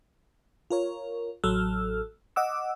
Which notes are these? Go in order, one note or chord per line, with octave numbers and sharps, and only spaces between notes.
F4 A#4 C#5
A1 F#3 A4 E6 F6
D#5 F#5 D6 E6